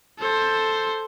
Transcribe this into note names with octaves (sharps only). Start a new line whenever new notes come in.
A4 C5